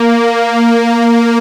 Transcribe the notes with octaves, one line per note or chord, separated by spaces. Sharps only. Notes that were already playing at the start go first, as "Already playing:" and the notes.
Already playing: A#3
A#3